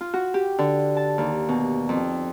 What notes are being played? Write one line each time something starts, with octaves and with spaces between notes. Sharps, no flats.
F4
F#4
G4
D3
A5
D#2
B2
F2